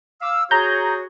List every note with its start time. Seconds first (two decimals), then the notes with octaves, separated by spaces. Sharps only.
0.22 F5 D6 E6
0.51 F#4 G#4 C#5 A#5 G6